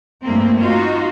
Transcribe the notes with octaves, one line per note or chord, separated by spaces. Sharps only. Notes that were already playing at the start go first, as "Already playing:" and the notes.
G2 F3 A3 A#3 C4
D#4 F4 F#4